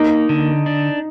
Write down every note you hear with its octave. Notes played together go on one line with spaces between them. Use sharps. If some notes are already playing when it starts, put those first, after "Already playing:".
Already playing: A#3 D#4
D3
D4